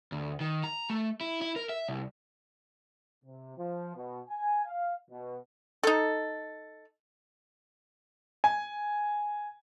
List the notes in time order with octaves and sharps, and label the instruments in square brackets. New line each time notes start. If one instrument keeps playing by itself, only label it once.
[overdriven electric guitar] D2
D#3
A#5
A3
E4
E4
A#4
E5
C2
[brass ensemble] C3
F3
B2
G#5
F5
B2
[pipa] D#4 A4
[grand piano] G#5